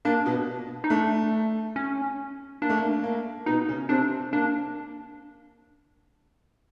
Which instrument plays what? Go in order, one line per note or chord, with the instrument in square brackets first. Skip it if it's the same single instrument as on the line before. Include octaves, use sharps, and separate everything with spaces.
[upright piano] A#3 [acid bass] D4
[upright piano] B2 B3
[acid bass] D#4
[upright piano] A3 [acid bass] D4
[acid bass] C#4
[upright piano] A#3 [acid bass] D4
[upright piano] A3
A#3
A#3
[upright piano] B2 B3 [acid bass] D#4
[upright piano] C#3 C#4
[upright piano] C3 C4 [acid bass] D4
[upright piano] A#3 [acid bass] D4